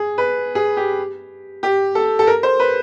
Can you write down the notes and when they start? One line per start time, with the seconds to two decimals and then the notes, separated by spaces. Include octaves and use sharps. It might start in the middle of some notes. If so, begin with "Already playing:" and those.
Already playing: G#4
0.18 B4
0.55 G#4
0.77 G4
1.63 G4
1.95 A4
2.19 A4
2.27 A#4
2.43 C5
2.60 B4